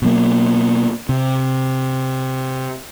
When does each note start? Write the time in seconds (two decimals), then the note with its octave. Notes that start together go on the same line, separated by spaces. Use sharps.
0.02 B2 F#3 A#3
1.09 C3